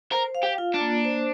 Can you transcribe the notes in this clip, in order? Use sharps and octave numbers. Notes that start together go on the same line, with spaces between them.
A#4 C5
F5
G4
F4
D4
A#3
C5